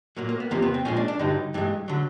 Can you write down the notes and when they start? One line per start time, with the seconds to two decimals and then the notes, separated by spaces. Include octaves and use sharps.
0.17 A#2 F#3 A#3
0.29 A#3
0.40 B3
0.51 E2 C3 F3 A#3
0.62 B3
0.74 C4
0.85 A#2 F3 G#3 C#4
0.97 D4
1.08 D4
1.19 G2 D3 F#3 D#4
1.54 G2 E3 G#3
1.88 D3 F#3